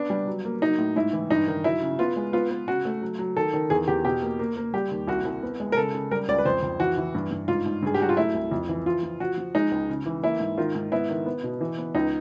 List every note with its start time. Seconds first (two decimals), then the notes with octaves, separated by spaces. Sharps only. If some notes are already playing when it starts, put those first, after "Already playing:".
Already playing: B3 D4
0.10 G3
0.27 F#3
0.45 A#3
0.62 F#3 D#4
0.79 A2
0.96 G#2 E4
1.13 E3
1.30 G2 D#4
1.48 D#3
1.64 F#3 E4
1.82 C#3
1.99 B3 F4
2.16 G#3
2.33 B3 F4
2.50 B3
2.68 C#3 F#4
2.85 A3
3.02 F#3
3.19 F#3
3.37 D#3 A4
3.53 D#3
3.70 E2 G#4
3.88 E2 G4
4.05 B2 G4
4.22 A#3
4.39 A#3
4.57 A#3
4.74 G3 G4
4.91 D#2
5.07 C2 F#4
5.25 C2
5.43 B3
5.60 G#3
5.72 A#4
5.77 C#3 A4
5.94 C#3
6.11 G3 A#4
6.29 C#2 D5
6.38 B4
6.45 F2 C5
6.62 F2
6.79 E3 F#4
6.97 E3
7.15 G2
7.31 G2
7.48 G#2 F4
7.66 G#2
7.83 G2 G#4
7.94 G4
8.00 F#3 F#4
8.09 F4
8.17 A3 E4
8.35 C2
8.51 F2
8.69 E3
8.86 F3 F4
9.03 F3
9.20 F3 F#4
9.38 F3
9.55 G#3 D#4
9.72 C#2
9.89 C#3
10.06 E3
10.23 A#3 E4
10.40 G#2
10.57 D#3 F4
10.75 G#2
10.92 B3 E4
11.09 D#3
11.26 B3
11.44 B2
11.61 E3
11.78 B3
11.95 C#2 D#4